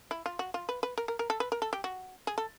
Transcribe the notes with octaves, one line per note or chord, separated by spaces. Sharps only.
E4
F4
F#4
F4
B4
B4
A#4
A#4
A#4
A4
B4
A#4
A4
G4
F#4
G#4
A4